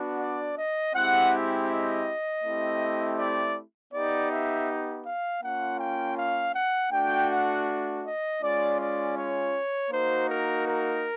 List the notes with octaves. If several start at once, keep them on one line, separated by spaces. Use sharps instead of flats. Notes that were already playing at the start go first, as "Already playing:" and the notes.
Already playing: B3 D4 F#4
D5
D#5
G#3 C4 E4 G4 F#5
D#5
A3 C4 E4 G4
D5
B3 D#4 G4 D5
E5
F5
A#3 C#4 F4 F#5
G5
F5
F#5
A3 D4 F#4 G5
F#5
D#5
G#3 C#4 F4 D5
D5
C#5
A#3 D#4 F#4 C5
A#4
A#4